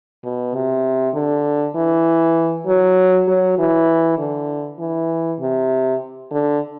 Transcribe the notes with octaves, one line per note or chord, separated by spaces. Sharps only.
B2
C3
D3
E3
F#3
F#3
E3
D3
E3
C3
D3